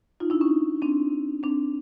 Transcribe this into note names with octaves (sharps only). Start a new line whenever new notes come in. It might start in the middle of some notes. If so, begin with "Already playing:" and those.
D#4 F4
D4 E4
C#4 D#4
C4 D4
C4 D4